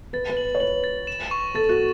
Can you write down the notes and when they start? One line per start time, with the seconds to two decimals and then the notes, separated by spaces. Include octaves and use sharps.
0.13 B4 A6
0.30 B4
0.37 F#7
0.55 C#5
0.60 B4 F#7
0.84 A6
1.07 E7
1.31 C#6
1.55 A4 A6
1.69 F#4